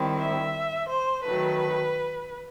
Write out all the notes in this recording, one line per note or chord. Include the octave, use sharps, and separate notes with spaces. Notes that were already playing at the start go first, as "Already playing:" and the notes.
Already playing: D#3 G3 C4 E4
E5
C5
D#3 F#3 A3 B4